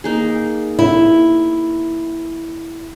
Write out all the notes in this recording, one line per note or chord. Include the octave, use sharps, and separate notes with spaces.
A#3 D#4 G#4
E4